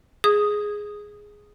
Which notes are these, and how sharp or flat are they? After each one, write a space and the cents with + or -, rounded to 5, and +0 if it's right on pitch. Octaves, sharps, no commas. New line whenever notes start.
G#4 +0 D#6 +0